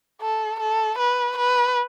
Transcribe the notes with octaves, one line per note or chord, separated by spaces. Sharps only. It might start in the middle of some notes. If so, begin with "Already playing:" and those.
A4
A4
B4
B4